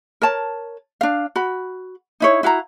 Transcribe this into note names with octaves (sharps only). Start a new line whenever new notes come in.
A#4 C#5 A5
D4 F5
F#4 B5
D#4 E4 C#5
E4 F#4 F5 A#5